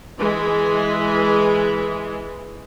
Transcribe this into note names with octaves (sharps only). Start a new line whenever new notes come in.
E3 G#3